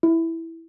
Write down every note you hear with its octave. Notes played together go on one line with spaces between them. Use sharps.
E4